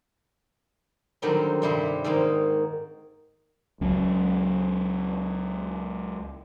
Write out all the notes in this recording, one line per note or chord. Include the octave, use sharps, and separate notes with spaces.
D3 D#3 F#3 G3 C4 C#4
G2 C3 G3 E4 C5 C6
G#2 D#3 G#3 A#3 F5
C#2 F#3 C#4